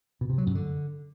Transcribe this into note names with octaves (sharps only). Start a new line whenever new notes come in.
B2
C3
F#3
F#2
D3